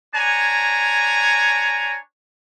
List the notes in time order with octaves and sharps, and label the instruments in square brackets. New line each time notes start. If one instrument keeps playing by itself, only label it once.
[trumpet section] D4 C#5 G#5 A#5